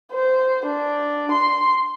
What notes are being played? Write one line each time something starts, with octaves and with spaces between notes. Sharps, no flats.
C5
D4
C6